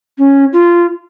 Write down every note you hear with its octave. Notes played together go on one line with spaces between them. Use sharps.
C#4
F4